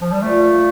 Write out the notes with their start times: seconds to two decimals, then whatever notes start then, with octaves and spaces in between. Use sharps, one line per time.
0.01 F3
0.12 G3
0.22 A#2 F3 A3 A#3